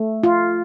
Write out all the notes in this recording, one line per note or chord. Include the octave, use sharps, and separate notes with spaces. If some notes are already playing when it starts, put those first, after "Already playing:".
Already playing: A3
F4